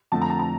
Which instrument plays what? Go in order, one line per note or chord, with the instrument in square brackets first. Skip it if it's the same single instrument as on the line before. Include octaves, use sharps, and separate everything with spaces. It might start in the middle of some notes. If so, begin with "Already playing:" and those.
[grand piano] F2 D3 A3 [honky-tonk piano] A5
[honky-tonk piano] A#5
A5
A#5